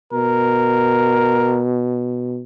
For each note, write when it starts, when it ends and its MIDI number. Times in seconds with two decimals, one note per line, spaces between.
0.13 2.43 47
0.13 1.61 70